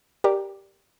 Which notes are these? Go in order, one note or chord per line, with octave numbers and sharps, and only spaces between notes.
G4 A#4 D5